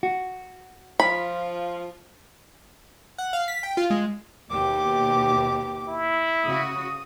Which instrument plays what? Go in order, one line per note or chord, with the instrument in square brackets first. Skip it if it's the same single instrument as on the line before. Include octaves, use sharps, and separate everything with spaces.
[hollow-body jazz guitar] F#4
[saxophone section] F3 F4 [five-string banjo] B5
[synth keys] F#5
F5
B6
G5
F4
G#3
[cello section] D#2 B2 [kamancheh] G4 D6
[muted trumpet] E4
[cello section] C#3 F#4 [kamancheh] D#6